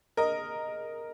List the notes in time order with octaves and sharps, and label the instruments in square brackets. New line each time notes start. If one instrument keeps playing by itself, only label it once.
[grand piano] A#4 D#5